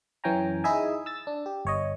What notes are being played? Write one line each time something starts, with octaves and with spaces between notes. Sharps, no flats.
F#2 E3 C#4 G5 G#5 A#5
D#4 E4 G#4 D#5 E5 G#5
E6 A6
D4
G4
G1 C#5 D#5